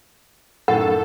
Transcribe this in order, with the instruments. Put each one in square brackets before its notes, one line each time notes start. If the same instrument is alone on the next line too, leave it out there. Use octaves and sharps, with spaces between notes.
[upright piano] F#2 A2 D#3 [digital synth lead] A4 [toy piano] F#5